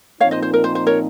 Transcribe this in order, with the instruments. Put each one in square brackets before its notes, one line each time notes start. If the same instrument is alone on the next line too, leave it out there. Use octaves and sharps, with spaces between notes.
[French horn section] A#2 F3 C4 D#4 [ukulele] C#5 F5
[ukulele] C5 D#5
C5
A#4
C5
C5
A#4 C#5